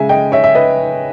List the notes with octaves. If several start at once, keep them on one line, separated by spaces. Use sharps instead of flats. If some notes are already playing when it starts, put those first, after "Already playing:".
Already playing: C#3 G#3 E5 G#5
D#5 G5
C#5 E5
E5
B4 D#5